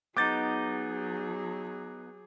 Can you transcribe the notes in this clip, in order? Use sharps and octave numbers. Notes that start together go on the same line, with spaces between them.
F#3 B3 D#4 G#4 D6 G6 A6